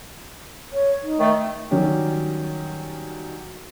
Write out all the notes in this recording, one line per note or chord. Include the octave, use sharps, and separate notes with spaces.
C#5
D#4
D#3 A3
D#3 F#3 G3 C#4 G4